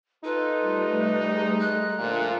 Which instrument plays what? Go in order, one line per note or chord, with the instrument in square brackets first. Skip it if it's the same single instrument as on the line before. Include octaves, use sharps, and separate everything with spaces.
[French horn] D#4 [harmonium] F4 A4 [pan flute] B4
[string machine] G3 A3
[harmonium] C3
G#3 D#5 A#5
[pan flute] F#6
[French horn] A#2 [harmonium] D3 F3 A3 [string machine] F4 A4